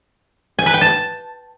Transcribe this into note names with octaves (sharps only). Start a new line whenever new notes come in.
G#5
B4
G5
A5